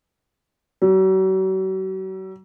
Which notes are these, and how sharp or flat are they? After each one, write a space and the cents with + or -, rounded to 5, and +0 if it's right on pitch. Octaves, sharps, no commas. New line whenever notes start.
F#3 +40